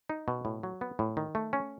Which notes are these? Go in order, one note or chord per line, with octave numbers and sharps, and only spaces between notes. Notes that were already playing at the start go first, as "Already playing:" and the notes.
D#4
B2
A2
F#3
B3
A2
D#3
A3
C#4